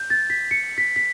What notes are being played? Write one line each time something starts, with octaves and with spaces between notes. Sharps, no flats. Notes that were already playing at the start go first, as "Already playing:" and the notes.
Already playing: G6
A6
B6
C#7
B6
B6